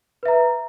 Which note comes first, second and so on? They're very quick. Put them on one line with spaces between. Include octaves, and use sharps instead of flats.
B4 E5 A#5